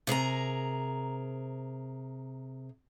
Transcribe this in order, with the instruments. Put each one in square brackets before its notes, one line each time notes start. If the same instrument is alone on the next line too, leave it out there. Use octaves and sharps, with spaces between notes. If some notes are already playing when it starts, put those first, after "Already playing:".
[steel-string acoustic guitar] C3 G#4 A#4 A#5